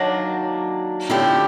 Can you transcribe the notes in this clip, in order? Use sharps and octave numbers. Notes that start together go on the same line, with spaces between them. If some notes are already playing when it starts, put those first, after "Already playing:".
Already playing: D#3 F#3 A#3 D4
D3 F3 A3 C#4 E4 G4